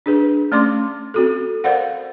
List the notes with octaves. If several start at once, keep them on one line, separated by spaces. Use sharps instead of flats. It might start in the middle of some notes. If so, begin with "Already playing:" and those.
D4 G#4 B4
A3 C#4 D5 C6 D6
C4 F#4 A4
A#4 C5 D5 F5 F#5